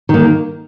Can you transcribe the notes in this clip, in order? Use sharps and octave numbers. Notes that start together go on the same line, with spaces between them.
D#3 A#3